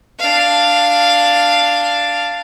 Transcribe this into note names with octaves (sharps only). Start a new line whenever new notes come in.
D4 F5